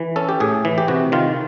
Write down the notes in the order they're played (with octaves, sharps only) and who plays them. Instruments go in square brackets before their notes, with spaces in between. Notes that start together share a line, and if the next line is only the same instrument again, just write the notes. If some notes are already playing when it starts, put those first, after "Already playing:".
Already playing: [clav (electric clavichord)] E3
C#4 A4
G4
A2 G#4
E3
G4
C3 F#4
D#3 F4